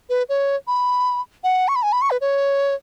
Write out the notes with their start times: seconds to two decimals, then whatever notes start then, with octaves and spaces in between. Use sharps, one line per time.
0.10 B4
0.29 C#5
0.67 B5
1.44 F#5
1.68 C#6
1.76 B5
1.83 G#5
1.92 B5
2.02 C#6
2.11 B4
2.21 C#5